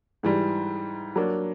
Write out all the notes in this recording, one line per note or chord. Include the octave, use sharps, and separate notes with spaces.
G#2 E3 G3
F#3 A#3 D4